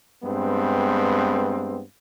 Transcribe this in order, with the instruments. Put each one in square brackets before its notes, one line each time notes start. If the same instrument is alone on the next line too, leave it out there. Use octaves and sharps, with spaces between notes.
[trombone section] G2 G#3 B3 C4